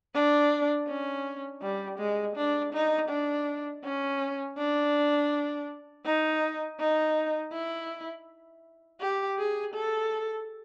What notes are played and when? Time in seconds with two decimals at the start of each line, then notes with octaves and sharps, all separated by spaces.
0.14 D4
0.88 C#4
1.62 G3
1.99 G#3
2.36 D4
2.73 D#4
3.09 D4
3.84 C#4
4.58 D4
6.05 D#4
6.80 D#4
7.53 E4
9.01 G4
9.38 G#4
9.74 A4